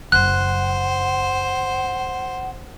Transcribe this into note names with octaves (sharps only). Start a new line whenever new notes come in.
F#1 C5 F#5 F#6